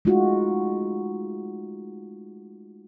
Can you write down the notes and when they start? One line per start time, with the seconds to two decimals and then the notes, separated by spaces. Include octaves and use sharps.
0.05 G#3 A3 D#4 F4 F#4